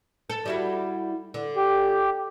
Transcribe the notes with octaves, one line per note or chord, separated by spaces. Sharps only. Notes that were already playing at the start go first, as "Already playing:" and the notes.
A4
G3 E4 F#4
D3
G4